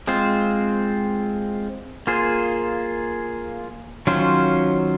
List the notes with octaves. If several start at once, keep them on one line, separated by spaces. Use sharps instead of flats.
G#3 C4 F4 C5
A#3 F4 G#4 C5
D#3 F#3 C#4 F4 C5